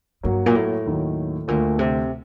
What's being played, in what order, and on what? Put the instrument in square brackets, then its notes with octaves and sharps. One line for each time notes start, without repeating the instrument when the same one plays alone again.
[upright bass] G2 [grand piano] F#3 A#3 F#4
[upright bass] A#2
A2
[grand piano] D#2 D#3 F#3
[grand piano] D2 D3 A3 [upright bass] A#2
[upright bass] C3